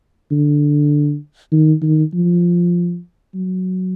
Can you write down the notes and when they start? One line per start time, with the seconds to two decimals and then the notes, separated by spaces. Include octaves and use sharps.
0.31 D3
1.52 D#3
1.82 D#3
2.14 F3
3.35 F#3